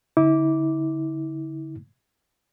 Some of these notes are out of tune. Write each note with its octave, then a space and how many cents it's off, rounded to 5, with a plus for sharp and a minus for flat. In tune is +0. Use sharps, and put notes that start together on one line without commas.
D3 -30 E4 -40 D6 -10